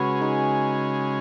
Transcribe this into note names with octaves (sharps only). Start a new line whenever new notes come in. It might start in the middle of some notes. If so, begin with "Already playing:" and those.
Already playing: C#3 G#3 C#4 F#4 B4
D#4 G#4